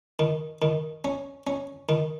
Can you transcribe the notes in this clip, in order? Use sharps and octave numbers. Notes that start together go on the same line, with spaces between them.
D#3
D#3
C#4
C#4
D#3